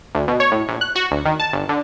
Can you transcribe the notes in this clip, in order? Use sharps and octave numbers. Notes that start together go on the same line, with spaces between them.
D2
B2
C#5
A2
A#1
F#6
F#4
D2
D#3
A5
G1
D3